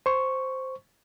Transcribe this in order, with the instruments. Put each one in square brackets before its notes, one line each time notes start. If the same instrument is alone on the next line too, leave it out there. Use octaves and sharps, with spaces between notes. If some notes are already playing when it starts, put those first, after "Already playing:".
[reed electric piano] C5 C#6